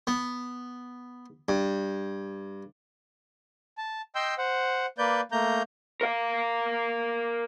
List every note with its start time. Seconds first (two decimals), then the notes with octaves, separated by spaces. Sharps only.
0.07 B3
1.49 G2
3.78 A5
4.15 D#5 G5 C6 E6 G6
4.38 C5 F#5
4.98 A#3 B4 D5 G6
5.32 A3 A#3 A#5 G6
6.01 A#4 F5